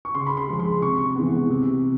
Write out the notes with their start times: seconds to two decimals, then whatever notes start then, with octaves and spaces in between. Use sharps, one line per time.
0.05 C#6
0.15 C#3 C6
0.26 B5
0.37 C6
0.48 F3 G#3
0.60 C6
0.82 C3 C#6
1.16 E3 G#3 B3
1.50 C3